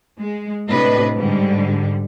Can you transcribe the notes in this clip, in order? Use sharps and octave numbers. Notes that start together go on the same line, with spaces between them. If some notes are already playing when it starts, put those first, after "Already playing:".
G#3
A2 C3 D4 B4 D#5
G#2 D3 G3